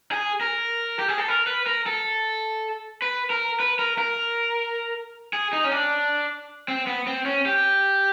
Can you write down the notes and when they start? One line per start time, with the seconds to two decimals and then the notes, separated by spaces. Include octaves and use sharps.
0.11 G#4
0.41 A#4
0.99 G4
1.08 G#4
1.18 A4
1.28 A#4
1.47 B4
1.67 A#4
1.86 A4
3.02 B4
3.30 A#4
3.60 B4
3.79 A#4
3.98 A#4
5.33 G#4
5.53 D#4
5.64 C#4
5.72 D4
6.68 C4
6.87 B3
7.07 C4
7.26 C#4
7.46 G4